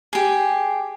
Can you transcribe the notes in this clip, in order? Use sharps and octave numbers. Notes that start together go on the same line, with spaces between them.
G4 G#4